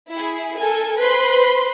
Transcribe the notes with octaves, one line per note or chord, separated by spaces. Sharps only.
E4 G#4
A4 A#4 G#5
B4 C5 B5 C6